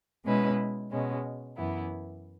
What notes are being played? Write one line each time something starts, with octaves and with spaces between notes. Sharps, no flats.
B2 G#3 C#4 E4 B4
B2 G#3 C#4
F#2 E3 B3 E4